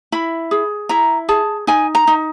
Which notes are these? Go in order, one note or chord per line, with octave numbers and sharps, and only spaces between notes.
E4 B5
G#4
E4 A#5
G#4 A5
D#4 G#5
A#5
D#4